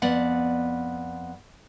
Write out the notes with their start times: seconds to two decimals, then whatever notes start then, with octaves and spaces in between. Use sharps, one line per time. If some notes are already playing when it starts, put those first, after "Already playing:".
0.02 F2 B3 D5 F#5